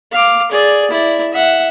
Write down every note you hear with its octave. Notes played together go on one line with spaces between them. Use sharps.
F5 D6
G#4 D5
E4 D5
E5 F#5